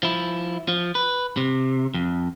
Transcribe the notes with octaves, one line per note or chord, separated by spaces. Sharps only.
F3 E4
F3
B4
C3
F2